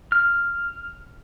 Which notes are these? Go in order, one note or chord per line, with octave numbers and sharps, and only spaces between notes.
F6